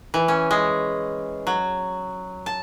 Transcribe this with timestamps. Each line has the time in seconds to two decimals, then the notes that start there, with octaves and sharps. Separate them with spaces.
0.14 E3
0.28 C#4
0.51 G#3
1.47 F#3
2.46 A5